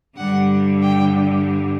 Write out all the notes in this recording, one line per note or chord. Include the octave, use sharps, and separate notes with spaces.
G2 D3 G3 F#5
G5